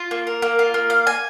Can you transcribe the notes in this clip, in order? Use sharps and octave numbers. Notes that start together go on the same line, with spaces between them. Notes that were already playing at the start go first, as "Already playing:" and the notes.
Already playing: F4
A#3
A#4
A#3
F4
A#3
F5
G#5